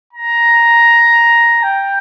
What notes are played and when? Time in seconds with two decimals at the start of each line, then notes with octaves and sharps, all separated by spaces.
0.13 A#5
1.63 G5